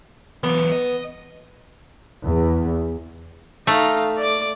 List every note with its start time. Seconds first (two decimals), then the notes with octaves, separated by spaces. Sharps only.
0.43 E3 F#3 B3
0.72 D#5
2.26 E2
3.67 A3 D#4 F5
4.18 D5 D6